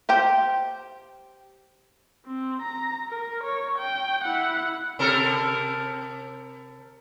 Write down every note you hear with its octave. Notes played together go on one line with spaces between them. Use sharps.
G4 C5 G5
C4
A#5
A#4
C#5
G5
E4 F#5
C3 A4 A#4